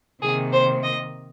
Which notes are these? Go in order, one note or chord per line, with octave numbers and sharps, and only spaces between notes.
C3 D#3 A#3 G#4
C5
D#5